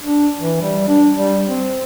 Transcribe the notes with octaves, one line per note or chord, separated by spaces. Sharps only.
D4
E3
G3
D4
G3
C4